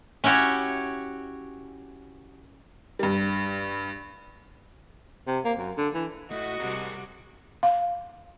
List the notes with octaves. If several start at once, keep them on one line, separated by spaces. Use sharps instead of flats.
C#4 E4 F#4 G4 C#5
G2 G3
C3
A#3
F#2
D3
E3
A3 E4 F#4 D#5
C3 G3 G#4 A#4
F5